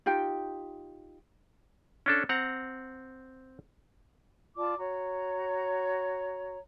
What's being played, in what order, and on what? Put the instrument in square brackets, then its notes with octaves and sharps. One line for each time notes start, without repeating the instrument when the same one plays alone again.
[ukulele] D#4 F4 G4 G5
[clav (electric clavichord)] C#4 D4 A4
C4 F#5 A#5
[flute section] F4 D5 A5 D6
F#4 C#5 A#5